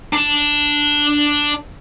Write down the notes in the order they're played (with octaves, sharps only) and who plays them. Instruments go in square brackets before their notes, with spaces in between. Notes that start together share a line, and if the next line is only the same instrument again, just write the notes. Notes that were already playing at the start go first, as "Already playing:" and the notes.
[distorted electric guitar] D4 A5